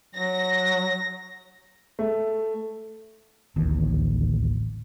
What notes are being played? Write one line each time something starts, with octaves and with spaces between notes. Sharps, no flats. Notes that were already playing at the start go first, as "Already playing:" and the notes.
F#3 A#6
A3
D1 A1 D#2